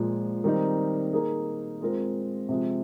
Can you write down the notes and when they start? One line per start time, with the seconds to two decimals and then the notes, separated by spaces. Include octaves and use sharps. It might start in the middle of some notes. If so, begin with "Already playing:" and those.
Already playing: A#2 F3 G#3
0.44 D#3 G3 C4 D#4
1.13 A#3 D#4 G#4
1.81 G#3 C4 F4 A#4
2.49 C3 F3 G#3